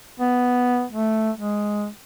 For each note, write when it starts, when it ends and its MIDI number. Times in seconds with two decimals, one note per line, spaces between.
0.20 0.84 59
0.92 1.31 57
1.37 1.87 56